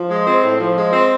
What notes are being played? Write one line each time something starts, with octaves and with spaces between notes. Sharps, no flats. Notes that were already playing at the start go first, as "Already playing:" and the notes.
Already playing: F3
G#3
C4
A2
F3
G#3
C4